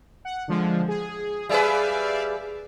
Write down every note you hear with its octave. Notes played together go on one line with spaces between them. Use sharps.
F#5
D3 F3 G#3
G#4
G3 G#4 B4 D5 E5 F5